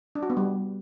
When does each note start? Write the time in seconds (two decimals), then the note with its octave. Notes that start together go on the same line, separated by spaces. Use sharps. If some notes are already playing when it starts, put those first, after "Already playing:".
0.15 D4
0.23 F#4
0.30 B3
0.37 G3